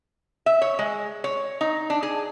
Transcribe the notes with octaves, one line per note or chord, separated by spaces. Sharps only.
E5
C#5
G#3
C#5
D#4
D4
G#4